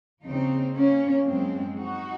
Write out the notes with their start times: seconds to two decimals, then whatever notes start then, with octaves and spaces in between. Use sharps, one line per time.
0.25 D#2 C#3 F3 C4 D#4
0.75 A#3 C#4
1.26 F#2 F3 G#3 C4
1.77 D#4 F#4